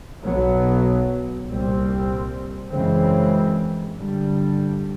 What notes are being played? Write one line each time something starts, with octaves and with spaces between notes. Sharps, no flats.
B1 B2 F#3 B3
C2 A#2 G3 C4
F#2 C#3 E3 G#3 C4
G2 D3 G3